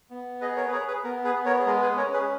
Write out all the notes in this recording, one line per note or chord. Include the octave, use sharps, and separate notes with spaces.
B3
G#4 B4 D#5
A#4 C#5
B4
G#4 A#4 C#5
G#4 B4
B3 A#4
G#4 B4
B3
A#4 C#5
G#4
G#3 A#4
G#4 B4
C#4 A#4 C#5
G#4 B4